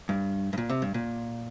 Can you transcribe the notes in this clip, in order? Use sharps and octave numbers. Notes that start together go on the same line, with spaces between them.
G2
G2
A#2
C3
G2
A#2